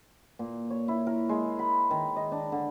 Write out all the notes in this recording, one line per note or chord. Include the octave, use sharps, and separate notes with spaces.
A#2
C#5
E4
A#4
G#3
B5
D#3
D#5
D4
D3